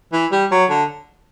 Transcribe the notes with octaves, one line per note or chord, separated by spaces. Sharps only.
E3
G3
F#3
D3